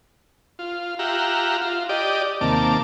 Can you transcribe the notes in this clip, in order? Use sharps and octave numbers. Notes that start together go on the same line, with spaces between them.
F4
F4 G4 E5 F#5 A#5
F4
G4 D5 D#5
D#2 C3 A#3 A5 D6